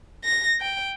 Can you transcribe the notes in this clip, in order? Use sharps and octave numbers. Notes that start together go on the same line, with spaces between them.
A#6
G5